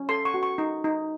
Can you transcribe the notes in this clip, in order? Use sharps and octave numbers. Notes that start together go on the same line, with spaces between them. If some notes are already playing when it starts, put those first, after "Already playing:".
Already playing: C#4
A4 C6
C#6
F#4
C#6
D#4
D#4